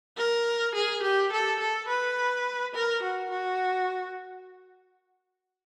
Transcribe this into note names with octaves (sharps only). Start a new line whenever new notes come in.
A#4
G#4
G4
A4
A4
B4
A#4
F#4
F#4